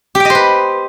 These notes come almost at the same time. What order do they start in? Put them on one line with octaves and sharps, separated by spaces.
G4 G5 D#5 C5 B4